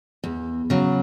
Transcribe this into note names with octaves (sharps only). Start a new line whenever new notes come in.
E2
C#3 F#3